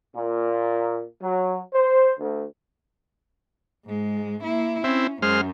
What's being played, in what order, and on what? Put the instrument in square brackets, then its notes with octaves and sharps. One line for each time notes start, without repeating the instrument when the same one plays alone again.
[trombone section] A#2
F#3
C5
D2
[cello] G#2 G#3
A#3 E4
[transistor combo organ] C4 E4 [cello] C#4
[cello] F#2 [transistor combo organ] G#3 C5 F6